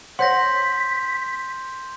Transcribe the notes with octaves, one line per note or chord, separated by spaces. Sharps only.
C5 C#5 F#5 C6 G6 A#6 B6